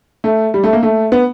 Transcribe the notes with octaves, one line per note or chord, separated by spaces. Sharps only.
A3
G3
A3
A#3
A3
B3